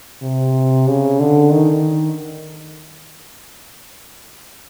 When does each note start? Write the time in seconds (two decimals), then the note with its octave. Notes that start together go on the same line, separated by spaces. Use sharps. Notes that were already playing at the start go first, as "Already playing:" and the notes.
0.22 C3
0.87 C#3
1.20 D3
1.52 D#3